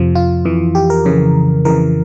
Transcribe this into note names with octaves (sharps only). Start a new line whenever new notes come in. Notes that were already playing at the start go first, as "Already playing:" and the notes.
Already playing: F2 C3 F3
F4
F2 E3
G4
A#4
F2 C#3 E3
F2 C#3 E3 A#4